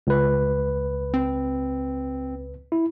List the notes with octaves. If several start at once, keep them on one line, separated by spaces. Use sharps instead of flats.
C#2 B4
C4
E4